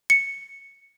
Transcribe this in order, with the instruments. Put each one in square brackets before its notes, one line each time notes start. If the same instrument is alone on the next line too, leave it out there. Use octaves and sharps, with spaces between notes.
[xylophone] C#7